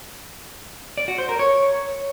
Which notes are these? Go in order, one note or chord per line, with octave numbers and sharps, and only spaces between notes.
D5
F#4
C5
A#4
C#5